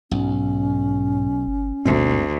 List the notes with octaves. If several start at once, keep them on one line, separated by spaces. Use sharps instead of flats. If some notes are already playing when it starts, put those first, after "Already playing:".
B1 G#2 C#4
G1
G1 D2 G#2 B2 C4